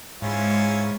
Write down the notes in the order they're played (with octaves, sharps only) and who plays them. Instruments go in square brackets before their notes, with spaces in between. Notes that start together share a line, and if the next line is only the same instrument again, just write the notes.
[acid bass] G#2 [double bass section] G#3 [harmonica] C#4 E4 F4